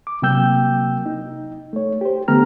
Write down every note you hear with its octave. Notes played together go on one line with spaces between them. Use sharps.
D6
C3 F#3 A#3 G5 E6 G6
D#4
A3 C#5
G4 C5
D3 A3 B3 G4 A#5 F6